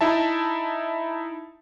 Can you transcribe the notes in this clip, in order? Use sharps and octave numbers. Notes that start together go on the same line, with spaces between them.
D#4 E4 E5 A5